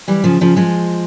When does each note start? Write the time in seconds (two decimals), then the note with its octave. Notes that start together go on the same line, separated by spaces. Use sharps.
0.08 E3 G3
0.24 C#3 F3
0.41 C#3 F3
0.56 F3 G#3